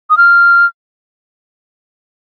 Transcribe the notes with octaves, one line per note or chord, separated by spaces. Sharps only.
D#6
F6